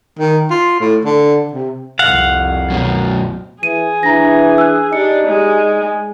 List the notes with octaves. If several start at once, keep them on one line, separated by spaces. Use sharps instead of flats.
D#3
F4
A2
D3
C3
C2 F2 F5 F#5
F#2 B2
E3 G#4 D#7
E3 D4 A#5 A#6
E6 F#6
D4 D#4 G4 C#7
G#3 G4
G#4